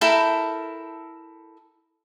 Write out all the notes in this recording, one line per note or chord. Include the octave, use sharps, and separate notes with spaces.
E4 A4 A#4 G5